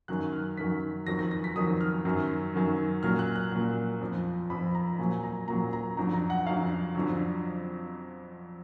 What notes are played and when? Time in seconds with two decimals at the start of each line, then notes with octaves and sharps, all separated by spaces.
0.08 F#2 D#3 F#3 F#6
0.33 F6
0.57 F#2 D#3 F#3 B6
1.07 F2 D#3 F#3 A#6
1.19 A#6
1.31 A#6
1.44 B6
1.56 F2 D#3 F#3 D#6
1.81 F6
2.05 F#2 D#3 F#3
2.54 F#2 D#3 F#3
3.03 A#2 F#3 F6
3.19 F#6
3.36 F#6
3.52 A#2 F#3
4.01 F2 F3
4.50 F2 F3 B5
4.75 A#5
4.99 A#2 F#3 G#5
5.24 A#5
5.48 A#2 F#3 A#5
5.73 A#5
5.97 F2 D3 F#3 A#5
6.14 A#5
6.30 F#5
6.47 F2 D3 F#3 F5
6.95 F2 D3 F#3